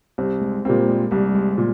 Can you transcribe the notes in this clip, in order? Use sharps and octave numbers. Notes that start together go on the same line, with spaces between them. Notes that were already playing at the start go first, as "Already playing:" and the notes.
C2 C4
G#3
A#2 G3 A#3 C4
G#3
C2 G3
G#3
A#2